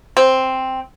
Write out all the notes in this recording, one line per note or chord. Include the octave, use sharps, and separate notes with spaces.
C4